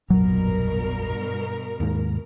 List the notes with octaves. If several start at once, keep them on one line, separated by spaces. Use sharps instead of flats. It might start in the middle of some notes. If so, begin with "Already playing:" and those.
F1 A#1 G2 B2 F#3 A#4
D#2 G#2